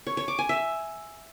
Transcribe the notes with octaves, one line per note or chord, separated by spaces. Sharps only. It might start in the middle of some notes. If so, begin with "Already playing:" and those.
C#5
C#5
D6
G#5
E5